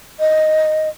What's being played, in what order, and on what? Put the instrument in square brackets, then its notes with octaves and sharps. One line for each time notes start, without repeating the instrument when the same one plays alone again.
[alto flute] D#5